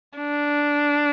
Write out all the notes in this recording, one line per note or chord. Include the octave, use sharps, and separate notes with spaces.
D4